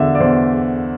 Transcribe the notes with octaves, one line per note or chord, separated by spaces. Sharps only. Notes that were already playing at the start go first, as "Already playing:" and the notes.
Already playing: E2 D3 E5
D5
E2 C5